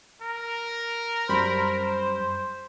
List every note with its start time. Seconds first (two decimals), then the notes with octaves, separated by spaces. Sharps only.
0.21 A#4
1.29 F#2 G3 C5 B5